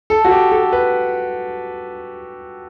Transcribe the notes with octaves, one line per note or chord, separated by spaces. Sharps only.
A4
F#4
G4
A4
B4